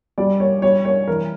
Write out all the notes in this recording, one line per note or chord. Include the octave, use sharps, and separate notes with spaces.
G3 D5
A#3 C#5
G3 C#5
A#3 C#5
E3 A#4